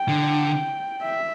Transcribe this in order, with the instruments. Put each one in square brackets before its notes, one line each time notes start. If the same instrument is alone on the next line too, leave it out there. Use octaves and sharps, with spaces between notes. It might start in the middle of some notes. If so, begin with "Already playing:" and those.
Already playing: [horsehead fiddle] G5
[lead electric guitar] D3
[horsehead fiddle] E5